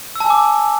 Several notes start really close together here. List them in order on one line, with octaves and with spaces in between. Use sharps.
E6 A5 G#5 D6